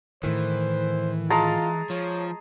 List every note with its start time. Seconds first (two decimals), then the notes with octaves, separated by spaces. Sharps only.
0.23 A2 D#3 E3 C5
1.30 G#3 F4 A5 A#5
1.90 F3 C#5